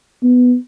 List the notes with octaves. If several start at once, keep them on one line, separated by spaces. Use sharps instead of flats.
B3